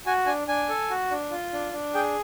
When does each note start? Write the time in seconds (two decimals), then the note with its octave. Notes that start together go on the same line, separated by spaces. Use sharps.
0.06 F#4 G#5
0.26 D4 G#5
0.48 D4 G#5
0.69 A4
0.90 F#4
1.11 D4
1.31 F4
1.53 D4
1.73 D4
1.94 G#4 G5